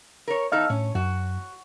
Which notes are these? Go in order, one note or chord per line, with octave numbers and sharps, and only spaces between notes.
A#4 C#5
E2 D#4 A4 D#5 F5 F6
A2 C#4
F#2 F#4